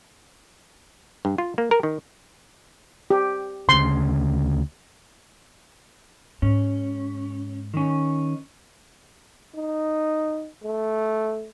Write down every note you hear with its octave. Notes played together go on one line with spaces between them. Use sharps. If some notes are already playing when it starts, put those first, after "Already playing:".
G2
F4
A#3
A#4
D#3
G4
D2 C#3 C6
G#2 C#4
D#3 C#4
D#4
A3